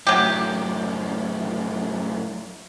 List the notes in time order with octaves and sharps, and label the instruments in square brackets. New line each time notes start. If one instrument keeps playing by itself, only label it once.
[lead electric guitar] F#2 A2 [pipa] F#3 G4